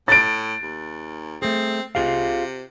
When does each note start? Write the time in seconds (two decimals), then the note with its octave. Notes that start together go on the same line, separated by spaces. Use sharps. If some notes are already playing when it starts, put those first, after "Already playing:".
0.08 A2 A6 D7
0.63 D#2
1.42 A3 C4 G#4
1.95 C3 F4 G#4 F5